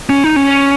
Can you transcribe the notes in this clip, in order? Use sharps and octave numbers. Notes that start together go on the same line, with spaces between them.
C#4
D#4
C#4